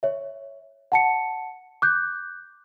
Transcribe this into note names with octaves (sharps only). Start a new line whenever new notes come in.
C#5 E5
F#5 A5 C#7
D6 F#6 G6